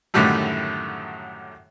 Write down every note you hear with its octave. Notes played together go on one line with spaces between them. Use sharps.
F#2 A2 D3 D#3 G3 A3